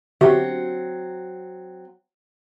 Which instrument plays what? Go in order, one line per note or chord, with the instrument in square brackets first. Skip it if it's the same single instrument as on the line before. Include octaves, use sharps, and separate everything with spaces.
[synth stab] D3 [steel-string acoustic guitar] F#3 C4 F#5 [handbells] F#4 G4 E5